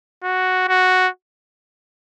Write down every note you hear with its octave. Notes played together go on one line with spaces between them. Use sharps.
F#4
F#4